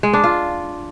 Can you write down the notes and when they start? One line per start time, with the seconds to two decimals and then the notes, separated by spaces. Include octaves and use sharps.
0.03 G#3
0.13 D4
0.24 F4